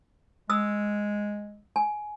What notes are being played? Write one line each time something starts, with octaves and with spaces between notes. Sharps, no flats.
G#3 D#6 E6
G#5